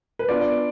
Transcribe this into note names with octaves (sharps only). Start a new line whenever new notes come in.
B4
B3 D4 F4 D5